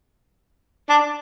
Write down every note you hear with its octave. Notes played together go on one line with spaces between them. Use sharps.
D4